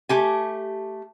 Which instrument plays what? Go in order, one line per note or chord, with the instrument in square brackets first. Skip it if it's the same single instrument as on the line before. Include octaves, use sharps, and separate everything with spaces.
[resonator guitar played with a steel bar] A3 G4 G#5